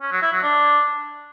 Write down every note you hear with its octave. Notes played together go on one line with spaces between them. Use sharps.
C#4
F#3
E4
F#3
D4